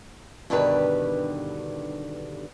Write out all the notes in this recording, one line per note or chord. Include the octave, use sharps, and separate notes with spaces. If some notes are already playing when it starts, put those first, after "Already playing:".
G2 B2 D3 D#3 G4 B4